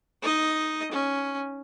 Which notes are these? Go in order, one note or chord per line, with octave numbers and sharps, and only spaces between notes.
D#4 D#5
C#4